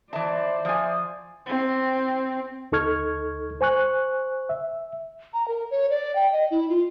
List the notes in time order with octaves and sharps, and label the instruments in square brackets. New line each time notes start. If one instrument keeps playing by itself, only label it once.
[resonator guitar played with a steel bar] E3 A5 [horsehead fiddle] C5 D5 [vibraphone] E5
[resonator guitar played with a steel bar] F3 G#5
[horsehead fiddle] C4
[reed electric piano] D2 D#4 A4 C#6 F6 G#6
C5 G#5 C#6 F#6
E5
[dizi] A#5
A#4
C#5
D5
G5
D#5
E4
F4